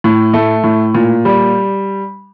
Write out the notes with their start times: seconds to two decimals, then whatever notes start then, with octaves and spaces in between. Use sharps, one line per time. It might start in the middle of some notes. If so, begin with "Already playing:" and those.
0.04 A2
0.34 A3
0.64 A2
0.94 A#2
1.25 G3